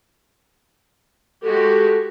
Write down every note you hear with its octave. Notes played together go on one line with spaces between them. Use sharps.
G#3 F#4 G4 A4